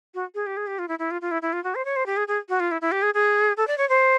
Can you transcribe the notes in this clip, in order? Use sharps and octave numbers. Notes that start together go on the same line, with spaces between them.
F#4
G#4
G4
G#4
G4
F4
E4
E4
F4
F4
E4
E4
F4
F#4
C5
C#5
C5
G4
G#4
G#4
F#4
F4
E4
E4
G4
G#4
G#4
A4
D5
C#5
C5